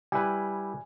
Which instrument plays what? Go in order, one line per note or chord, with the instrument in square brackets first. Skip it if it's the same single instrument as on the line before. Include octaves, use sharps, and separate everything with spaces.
[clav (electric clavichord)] G3 E4 B4 [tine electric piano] G#5